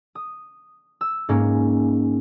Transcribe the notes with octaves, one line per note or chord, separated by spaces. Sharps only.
D#6
E6
G#2 A#3 C#4